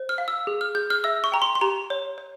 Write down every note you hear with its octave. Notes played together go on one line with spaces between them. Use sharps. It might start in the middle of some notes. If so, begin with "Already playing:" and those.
Already playing: C5
F6
F5
E6
G#4
F6
G#4 G6
F6
E5 E6
C#6
G5 A#5
C6
C6
G4 A#5
C#5
C#5